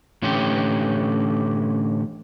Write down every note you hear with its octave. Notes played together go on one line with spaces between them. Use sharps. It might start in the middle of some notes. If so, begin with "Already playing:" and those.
A2 D3 E3 C#4 G4